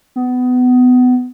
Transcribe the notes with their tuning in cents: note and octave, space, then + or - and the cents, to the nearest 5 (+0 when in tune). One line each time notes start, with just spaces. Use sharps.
B3 +25